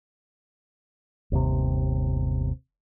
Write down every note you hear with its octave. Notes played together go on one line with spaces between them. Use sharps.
G1 D#2 C3